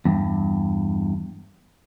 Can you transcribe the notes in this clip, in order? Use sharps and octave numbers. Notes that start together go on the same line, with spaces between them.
E2 G2